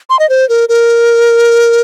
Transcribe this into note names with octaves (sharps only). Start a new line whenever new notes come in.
C6
D#5
C5
A#4
A#4